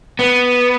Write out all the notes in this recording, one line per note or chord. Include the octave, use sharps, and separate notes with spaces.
B3